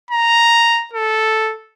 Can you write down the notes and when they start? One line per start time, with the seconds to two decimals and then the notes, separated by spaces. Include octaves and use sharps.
0.10 A#5
0.93 A4